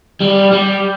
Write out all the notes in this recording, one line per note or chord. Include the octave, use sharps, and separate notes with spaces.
G3
G3